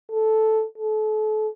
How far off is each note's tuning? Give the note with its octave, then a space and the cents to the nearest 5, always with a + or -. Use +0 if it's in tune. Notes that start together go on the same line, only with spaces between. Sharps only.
A4 -5
A4 -35